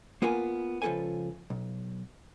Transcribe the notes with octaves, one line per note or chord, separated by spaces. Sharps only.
A#3 B3 F4 A#4 G#5
C#2 F3 G4 A4 B4 G#5
B1